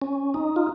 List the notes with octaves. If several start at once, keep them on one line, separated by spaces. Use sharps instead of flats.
C#4
D#4
F4